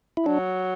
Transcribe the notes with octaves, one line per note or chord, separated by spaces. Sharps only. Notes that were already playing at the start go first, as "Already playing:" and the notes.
E4
F#3 D4